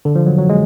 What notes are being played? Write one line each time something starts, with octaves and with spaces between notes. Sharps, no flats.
D3
F3
F#3
F#3
G#3